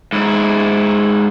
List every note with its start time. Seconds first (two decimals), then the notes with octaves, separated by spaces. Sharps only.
0.13 G#2 E4